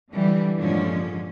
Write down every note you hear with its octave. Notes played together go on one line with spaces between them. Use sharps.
D3 E3 G3
G2 A#2 D3 F3 G#3 C#4